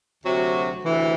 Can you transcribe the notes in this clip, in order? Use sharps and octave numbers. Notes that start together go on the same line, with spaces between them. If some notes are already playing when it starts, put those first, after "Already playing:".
D2 C3 F#3 C4 F#4
D2 C3 E3